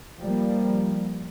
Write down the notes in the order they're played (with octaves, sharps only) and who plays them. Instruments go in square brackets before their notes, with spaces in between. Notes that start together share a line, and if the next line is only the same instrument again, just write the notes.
[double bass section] F3 G3 A#3